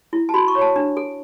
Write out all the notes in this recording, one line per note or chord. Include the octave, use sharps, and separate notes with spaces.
E4
A5
F#4 B5
C#6
C#5
A5
D4
A4